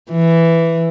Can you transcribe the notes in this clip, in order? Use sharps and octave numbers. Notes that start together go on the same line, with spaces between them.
E3